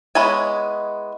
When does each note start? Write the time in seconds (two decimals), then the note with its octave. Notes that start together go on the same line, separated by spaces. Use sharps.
0.15 G#3 B3 E4 C#5 G#5